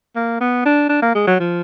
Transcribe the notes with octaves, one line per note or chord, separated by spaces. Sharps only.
A#3
B3
D4
D4
A#3
G#3
F#3
F3